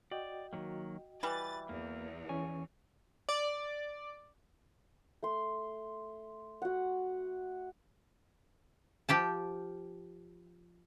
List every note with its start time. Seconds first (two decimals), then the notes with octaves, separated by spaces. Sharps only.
0.11 F#4 D5 D#5 G5
0.53 D#3 F#3 A#3
1.23 E3 G3 B4 A6
1.69 E2 A#3
2.29 E3 C#4 G#5 C#6
3.29 D5
5.23 A3 C6
6.62 F#4 F#5
9.09 F3 G4 G5 A5